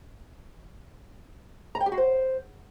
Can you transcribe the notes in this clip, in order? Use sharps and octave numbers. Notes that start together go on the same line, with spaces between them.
A#5
G5
G4
F#4
C5